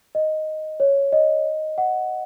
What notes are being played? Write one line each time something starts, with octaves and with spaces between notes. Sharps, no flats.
D#5
C#5
D#5
F#5